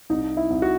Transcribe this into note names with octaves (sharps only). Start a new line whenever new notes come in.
C2 D#4
E4
C2
F#4